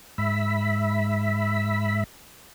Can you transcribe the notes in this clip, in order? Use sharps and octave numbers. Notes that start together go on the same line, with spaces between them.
G#2 E5 B5